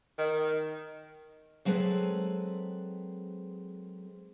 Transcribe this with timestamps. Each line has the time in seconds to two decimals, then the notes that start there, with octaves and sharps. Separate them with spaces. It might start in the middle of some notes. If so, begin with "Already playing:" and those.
0.19 D#3
1.65 F#3 G#3 C4 A4 B4